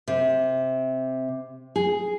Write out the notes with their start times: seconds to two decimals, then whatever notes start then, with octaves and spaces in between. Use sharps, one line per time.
0.08 C3
1.76 G#4